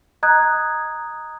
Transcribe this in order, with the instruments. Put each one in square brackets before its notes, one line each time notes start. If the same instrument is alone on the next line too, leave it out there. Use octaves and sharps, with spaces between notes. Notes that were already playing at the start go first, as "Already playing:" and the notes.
[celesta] D#5 A#5 D#6 F#6 G#6